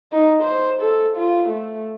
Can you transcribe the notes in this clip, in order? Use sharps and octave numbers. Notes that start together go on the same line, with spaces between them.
D#4
C5
A4
F4
A3